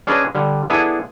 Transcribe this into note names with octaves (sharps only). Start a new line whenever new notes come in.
C#4 D4 G#4 B4 D5 D#5
D3 G3
B3 D4 E4 G#4 A4 G#5